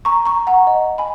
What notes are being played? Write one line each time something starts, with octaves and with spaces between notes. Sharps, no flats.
A#5 C#6
A#5 C#6
F#5 A#5
D#5
G#5 B5